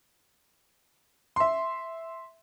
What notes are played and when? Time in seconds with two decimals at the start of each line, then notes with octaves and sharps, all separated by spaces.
1.36 E5 C6